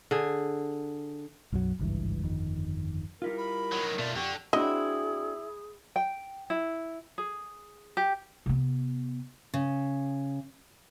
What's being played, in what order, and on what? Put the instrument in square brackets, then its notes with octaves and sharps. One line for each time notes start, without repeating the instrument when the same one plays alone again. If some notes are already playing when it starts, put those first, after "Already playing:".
[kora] D3 G#4
[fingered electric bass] B1 F#2 E3 F#3
G#1 C#2 G2 E3
G1 F2 D#3
[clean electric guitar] G3 E4 F4 [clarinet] A#4
[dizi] B5
[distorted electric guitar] D#3 F#3
[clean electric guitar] B2 [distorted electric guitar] A3 F4 [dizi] D5
[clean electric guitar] F2 G4 [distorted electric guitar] D3 [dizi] C#6
[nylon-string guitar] C4 D4 F#4 [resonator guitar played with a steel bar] E4 [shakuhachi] G#4 [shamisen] D#5
[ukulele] G5
E4
G#4
G4
[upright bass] C3 B3
[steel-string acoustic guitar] C#3